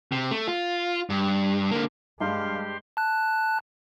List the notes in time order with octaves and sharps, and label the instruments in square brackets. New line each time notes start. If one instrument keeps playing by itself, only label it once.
[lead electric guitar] C3
A3
F4
G2
D3 A#3
[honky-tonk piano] G2 [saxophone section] G3 F5 [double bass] G#3 [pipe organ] G4 C6
[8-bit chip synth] A5 F#6